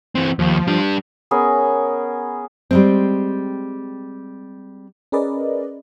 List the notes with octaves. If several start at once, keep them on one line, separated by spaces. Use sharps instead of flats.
E3 C4
D#2 F3
G3 D4
B3 C#4 G#4 A#4
G3 G#3 C4
C#4 G#4 A#4 B4 D5 D#5